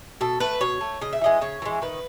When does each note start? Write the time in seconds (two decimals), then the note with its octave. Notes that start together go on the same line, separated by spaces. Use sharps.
0.21 B2 A4
0.40 A3 B4
0.61 B2 C#5
0.81 A3
1.01 C#3 D#5
1.13 E5
1.21 E3 G#3 D#5
1.41 C#3 C#5
1.62 E3 G#3
1.82 D#3 B4